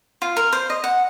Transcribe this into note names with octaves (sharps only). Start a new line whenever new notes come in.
F4
A#4
C5
D#5
F#5